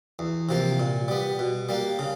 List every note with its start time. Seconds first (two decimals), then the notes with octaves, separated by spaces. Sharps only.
0.19 E2
0.49 C3 F3 A#3
0.80 A#2
1.08 G3 B3
1.39 B2
1.69 G3 A#3
1.99 C#3